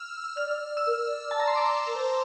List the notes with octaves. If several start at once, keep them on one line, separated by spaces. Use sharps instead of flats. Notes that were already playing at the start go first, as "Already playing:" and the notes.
Already playing: E6 F6
D5 F6
D5
D5
E6
A#4
D5
A5
A#5
C6
D6
A#4
C5